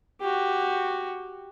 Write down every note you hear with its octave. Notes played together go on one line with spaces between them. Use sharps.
F#4 G4